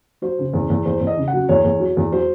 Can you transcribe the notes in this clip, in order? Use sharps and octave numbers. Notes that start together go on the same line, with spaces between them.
F#3 C5
C#3
E2
E2
E2 C5
E2
D#5
C#3
F#5
F#3
E2 C#5
E2
F#3
E2
F#3 C5